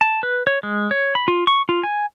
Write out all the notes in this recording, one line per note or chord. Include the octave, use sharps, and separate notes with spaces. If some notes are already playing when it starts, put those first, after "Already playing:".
A5
B4
C#5
G#3
C#5
B5
F4
C#6
F4
G#5